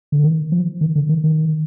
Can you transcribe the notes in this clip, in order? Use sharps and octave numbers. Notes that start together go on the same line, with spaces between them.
D3
D#3
F3
D#3
D3
D#3
D#3